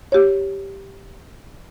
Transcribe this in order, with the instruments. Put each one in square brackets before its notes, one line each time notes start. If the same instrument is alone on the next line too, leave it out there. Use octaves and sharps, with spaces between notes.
[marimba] G4 C#5